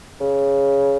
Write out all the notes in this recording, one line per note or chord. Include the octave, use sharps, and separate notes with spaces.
C#3